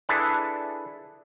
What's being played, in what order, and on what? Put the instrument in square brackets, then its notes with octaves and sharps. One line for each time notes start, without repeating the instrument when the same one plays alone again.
[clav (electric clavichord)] D4 E4 G#4 A4 B4